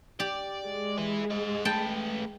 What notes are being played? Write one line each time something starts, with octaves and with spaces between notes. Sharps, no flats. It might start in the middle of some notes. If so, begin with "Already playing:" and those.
G4 D5
G#3
E4 B4
C5 D#5
A3 B4 G5 A5